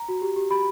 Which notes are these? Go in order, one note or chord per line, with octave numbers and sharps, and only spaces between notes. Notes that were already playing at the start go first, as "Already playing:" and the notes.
Already playing: A#5
F#4
G4
G4
G4 B5